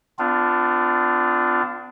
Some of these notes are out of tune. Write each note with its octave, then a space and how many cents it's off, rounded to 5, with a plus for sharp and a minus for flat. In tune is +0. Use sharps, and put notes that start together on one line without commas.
B3 +45 D4 +0 F4 +0